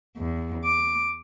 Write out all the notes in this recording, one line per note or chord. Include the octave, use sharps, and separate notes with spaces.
E2
D6